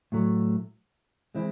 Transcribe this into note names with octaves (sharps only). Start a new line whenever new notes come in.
A2 F#3 A3
E3 G#3 C4 E4